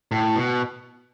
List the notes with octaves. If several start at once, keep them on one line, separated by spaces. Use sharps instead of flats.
A2
B2